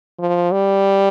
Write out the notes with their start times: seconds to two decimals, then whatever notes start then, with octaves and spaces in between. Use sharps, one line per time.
0.19 F3
0.52 G3